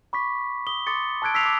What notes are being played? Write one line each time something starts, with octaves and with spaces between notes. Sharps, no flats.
B5 C#6 D6 B6
D#6 G7
C6 D6 D#6 A6 C#7
A5 E6 F#6 G#6 D7
E6 B6 C7 F7
D6